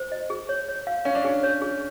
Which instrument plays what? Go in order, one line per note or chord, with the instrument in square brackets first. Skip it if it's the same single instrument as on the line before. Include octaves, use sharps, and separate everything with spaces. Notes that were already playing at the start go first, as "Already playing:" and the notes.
Already playing: [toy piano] C5
D#5
G#4
C#5
C#5
F5
[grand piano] C#4 [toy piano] F5
[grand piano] D4
[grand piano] C#4 [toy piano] G#4
[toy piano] C#5
G#4